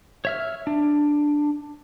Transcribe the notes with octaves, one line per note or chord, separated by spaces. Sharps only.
C#5 E5 F6
D4